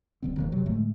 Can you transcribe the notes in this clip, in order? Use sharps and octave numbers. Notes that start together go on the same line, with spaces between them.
D1 D3 C4
E1 D#3 A#3
F#1 C3 F#3
A2 D3 G#3 A3